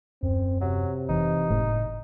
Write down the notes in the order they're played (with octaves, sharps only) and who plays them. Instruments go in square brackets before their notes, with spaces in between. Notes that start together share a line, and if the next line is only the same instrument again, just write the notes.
[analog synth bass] D#1 [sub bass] F#2 [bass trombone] C4
[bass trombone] C3 [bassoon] F#3
[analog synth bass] F#1 [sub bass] E3 [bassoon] D#4
[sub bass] F#1 [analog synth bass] A2